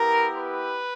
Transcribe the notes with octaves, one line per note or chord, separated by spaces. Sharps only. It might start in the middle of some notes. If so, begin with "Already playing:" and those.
Already playing: B3 E4 G4 A#4
B4